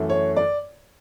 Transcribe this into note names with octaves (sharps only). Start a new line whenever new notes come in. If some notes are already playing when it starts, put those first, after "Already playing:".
Already playing: F#2 E3 A3
C#5
D5